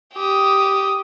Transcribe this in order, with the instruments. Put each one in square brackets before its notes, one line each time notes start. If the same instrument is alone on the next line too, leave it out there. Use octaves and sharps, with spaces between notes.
[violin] G4 D#6